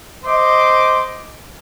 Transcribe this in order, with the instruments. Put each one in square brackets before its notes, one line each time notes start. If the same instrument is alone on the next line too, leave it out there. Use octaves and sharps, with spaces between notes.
[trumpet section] C5 D#5 C6 D6